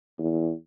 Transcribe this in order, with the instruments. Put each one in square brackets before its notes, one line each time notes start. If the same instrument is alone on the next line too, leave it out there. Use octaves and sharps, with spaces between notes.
[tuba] E2